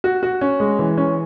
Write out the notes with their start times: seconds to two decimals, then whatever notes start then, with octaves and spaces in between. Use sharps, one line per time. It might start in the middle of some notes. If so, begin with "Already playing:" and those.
0.04 F#4
0.23 F#4
0.41 C#4
0.60 G#3
0.79 E3
0.97 C#4